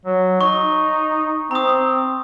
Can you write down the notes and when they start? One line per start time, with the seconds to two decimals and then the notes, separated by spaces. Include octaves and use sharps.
0.05 F#3
0.41 D#4 C#6
1.51 C4 A#5 D#6